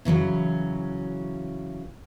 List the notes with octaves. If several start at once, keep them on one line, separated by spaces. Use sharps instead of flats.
C#3 E3 F#3 C#4